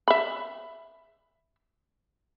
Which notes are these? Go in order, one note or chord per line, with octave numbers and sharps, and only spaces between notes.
E5 B5